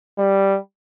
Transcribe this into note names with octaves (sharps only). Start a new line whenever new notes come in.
G3